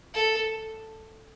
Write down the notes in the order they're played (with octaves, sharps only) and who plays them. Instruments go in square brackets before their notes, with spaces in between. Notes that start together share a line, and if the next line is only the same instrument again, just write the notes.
[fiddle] A4